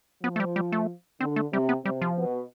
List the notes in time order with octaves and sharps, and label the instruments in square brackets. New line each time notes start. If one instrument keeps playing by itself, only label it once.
[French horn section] F3 [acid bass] B3
[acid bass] A3
G3
G3
A3
[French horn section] D3 [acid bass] C4
[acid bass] A3
[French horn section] C3 [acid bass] G3
[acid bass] B3
[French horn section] C3 [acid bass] G3
[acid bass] F3
[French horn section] B2